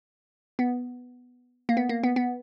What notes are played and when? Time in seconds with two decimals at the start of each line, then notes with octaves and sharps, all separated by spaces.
0.59 B3
1.69 A#3
1.77 B3
1.89 A#3
2.04 B3
2.16 B3